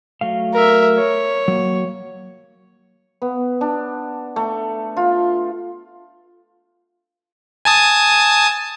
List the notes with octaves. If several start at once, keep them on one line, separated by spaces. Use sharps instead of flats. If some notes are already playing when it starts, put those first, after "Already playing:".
F#3 A3 F5
A#4 E5
C#5
F#3 A#3
B3
D4
A3
F4
G#5 A5 D#6